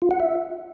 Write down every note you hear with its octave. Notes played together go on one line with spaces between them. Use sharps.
F4
F#5
E5